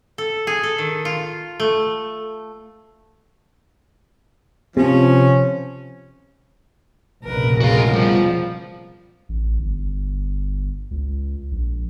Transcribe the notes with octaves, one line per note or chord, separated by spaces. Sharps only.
A4
G#4
A4
D#3
F4
A3
C3 F3 C#4
F1 A#1 C#3 A#4 B4
F2 G#3 F#4 A#4 F5
B2 F3 G3
A1
G1
C#2
A#1